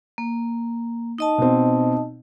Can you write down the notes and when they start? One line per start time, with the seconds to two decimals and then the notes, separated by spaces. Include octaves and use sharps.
0.18 A#3
1.18 D#4 D#5 A5
1.38 B2 C4